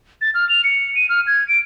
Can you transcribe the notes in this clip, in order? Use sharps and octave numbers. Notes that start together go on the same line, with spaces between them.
A6
F6
F7
C#7
D#7
F6
G#6
D7